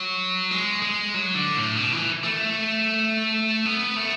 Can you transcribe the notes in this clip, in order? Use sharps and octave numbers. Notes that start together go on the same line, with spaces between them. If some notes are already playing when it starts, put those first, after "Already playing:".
Already playing: F#3
G#3
G#3
F#3
D3
A2
B2
E3
A3
B3
A3